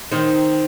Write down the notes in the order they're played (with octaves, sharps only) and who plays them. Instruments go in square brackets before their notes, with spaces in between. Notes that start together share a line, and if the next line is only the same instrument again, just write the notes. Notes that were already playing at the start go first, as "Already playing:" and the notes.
[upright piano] D#3 [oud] C4 D#4